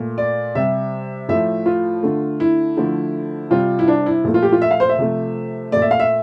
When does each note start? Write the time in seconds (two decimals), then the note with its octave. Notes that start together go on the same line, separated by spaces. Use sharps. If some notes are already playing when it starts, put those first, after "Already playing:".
Already playing: A#2 A3
0.18 D5
0.55 C3 G3 E5
1.29 A2 F3 A3 E5
1.66 F4
2.03 D3 A3
2.40 E4
2.77 D3 F3 A3
3.51 C3 G3 F4
3.79 E4
3.88 D4
4.06 E4
4.24 A#2 F3 A3
4.34 F4
4.42 G4
4.52 F4
4.62 E5
4.71 F5
4.80 C5
4.89 E5
4.98 C3 F3 A3
5.72 A#2 A3 D5
5.82 E5
5.91 F5
6.00 E5